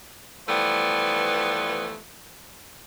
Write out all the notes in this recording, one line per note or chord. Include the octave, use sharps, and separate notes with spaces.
E3 F3 G3 A3 B3